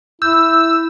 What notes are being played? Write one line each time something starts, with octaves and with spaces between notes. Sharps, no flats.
E4 E6 G6